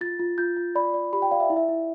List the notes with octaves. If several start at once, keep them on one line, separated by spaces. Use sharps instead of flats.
F4 A6
F4
F4 G6
F4
D5 B5
D5
G4 B5
G5
D5 F5
E5
E4
E5
E4